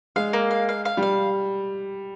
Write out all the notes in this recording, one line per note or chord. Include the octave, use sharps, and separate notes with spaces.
G#3 F5
A#3
F5
F5
F5
G3
F5